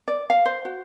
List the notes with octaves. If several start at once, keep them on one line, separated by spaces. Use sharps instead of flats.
D5
F5
C5
F#4